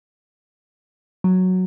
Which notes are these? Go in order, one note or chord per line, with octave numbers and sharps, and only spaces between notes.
F#3